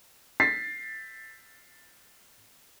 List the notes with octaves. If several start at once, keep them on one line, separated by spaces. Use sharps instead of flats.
A6 B6 C7